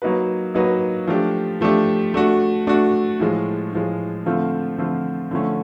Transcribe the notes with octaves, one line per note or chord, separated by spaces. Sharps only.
F#3 A#3 D#4 F#4 B4
F#3 A#3 D#4 F#4 B4
F3 A3 D4 G4
F3 A3 D4 G4
A3 D4 F#4
A3 D4 F#4
A2 F3 G#3
A2 F3 G#3
D3 F3 A3 C4 F4
D3 F3 A3 C4 F4
D3 F3 A3 C#4